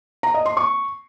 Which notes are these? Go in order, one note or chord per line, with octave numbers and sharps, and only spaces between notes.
A#5
D#5
C6
C#6